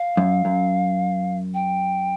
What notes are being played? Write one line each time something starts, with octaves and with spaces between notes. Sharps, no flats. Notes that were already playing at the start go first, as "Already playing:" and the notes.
Already playing: F5
F#2
F#2
G5